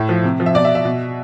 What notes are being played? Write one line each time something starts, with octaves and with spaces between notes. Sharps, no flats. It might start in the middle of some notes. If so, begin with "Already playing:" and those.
Already playing: A2 E5
F3
C3
F3
E5
B2 D5
E5
E5
B2